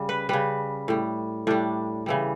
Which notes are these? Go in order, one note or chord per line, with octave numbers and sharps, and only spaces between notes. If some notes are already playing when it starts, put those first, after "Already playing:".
Already playing: C#3 G3
B4
C#3 G3 B4
A2 G3
A2 G3 D4
C#3 E3 G3